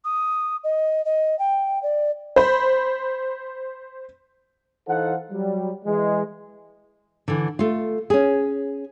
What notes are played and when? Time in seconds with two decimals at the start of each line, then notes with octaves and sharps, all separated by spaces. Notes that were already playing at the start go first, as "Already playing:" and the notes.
0.05 D#6
0.64 D#5
1.05 D#5
1.39 G5
1.83 D5
2.36 C5 B5
4.87 E3 D#4 A4 C5 F5 F#5
5.31 F#3 G3
5.85 E3 G#3
7.28 D3 E3
7.59 A3 F4
8.10 C#4 G#4